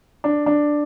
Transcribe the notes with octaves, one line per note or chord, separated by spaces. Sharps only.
D4
D4